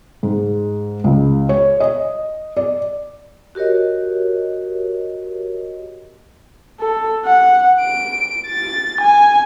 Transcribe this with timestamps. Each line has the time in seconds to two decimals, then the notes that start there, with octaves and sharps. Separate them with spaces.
0.23 G#2
1.04 C#2
1.49 C#5
1.80 D#5
2.57 D5
3.55 F#4 G4 A#4 C#5 D#5
6.81 A4
7.25 F#5
7.80 D7
8.47 A6
9.01 G#5